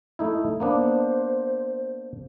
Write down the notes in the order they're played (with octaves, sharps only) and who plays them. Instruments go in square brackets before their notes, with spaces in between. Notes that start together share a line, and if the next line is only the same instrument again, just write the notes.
[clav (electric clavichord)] A3 D#4 E4
[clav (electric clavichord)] A#3 B3 D4 [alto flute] C5